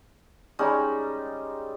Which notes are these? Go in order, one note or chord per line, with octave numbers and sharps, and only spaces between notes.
G3 G#3 C#4 D#4